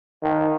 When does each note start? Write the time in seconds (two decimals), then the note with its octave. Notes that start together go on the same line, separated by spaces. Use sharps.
0.23 D#3